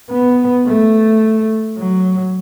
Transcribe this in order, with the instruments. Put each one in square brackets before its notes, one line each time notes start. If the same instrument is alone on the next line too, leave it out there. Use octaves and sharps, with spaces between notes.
[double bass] B3
A3
F#3